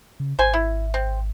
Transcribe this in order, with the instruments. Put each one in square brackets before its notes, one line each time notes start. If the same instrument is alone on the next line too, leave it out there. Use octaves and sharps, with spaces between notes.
[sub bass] C#3
[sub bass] G#1 [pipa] C5 G#5
[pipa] E4
C4